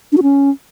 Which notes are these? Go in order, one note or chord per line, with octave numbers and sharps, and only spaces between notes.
D4
F#4
C#4